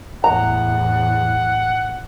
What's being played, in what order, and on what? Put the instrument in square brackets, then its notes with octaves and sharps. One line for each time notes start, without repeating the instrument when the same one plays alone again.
[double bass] E2 A2 [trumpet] F#5 [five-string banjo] A#5